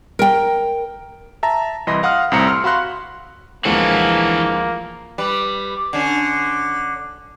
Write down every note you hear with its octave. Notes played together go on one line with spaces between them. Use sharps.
A#4 G5
E5 A5 A#5
C2 E3 D#5 B5 C6 A#6
F5 F#5 C6 D#6 F6
C2 A2 C4 A#5 C#7
C6 E6 F6
F#4 F5 B5 C6 F#6
D2 E3 F3 G#3 A#3 F#4
G3 B4 D5
D3 C#4